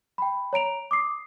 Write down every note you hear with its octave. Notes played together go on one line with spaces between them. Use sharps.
G5 B5
C#5 A#5 D7 F7
D6 D#6 C7